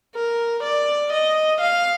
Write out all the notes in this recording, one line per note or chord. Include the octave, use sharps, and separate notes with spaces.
A#4
D5
D#5
F5